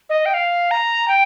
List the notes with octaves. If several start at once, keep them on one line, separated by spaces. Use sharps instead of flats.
D#5
G5
F5
A#5
G5